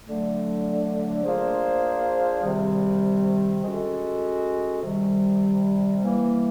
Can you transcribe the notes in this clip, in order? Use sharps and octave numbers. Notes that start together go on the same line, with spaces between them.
D3 F#3 A3
A#3 D4 F4 G#4 C5
C3 D#3 G3
G#3 C#4 F#4 A4
C3 D#3 G3
E3 G3 A#3